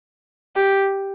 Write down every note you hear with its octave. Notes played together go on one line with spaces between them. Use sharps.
G4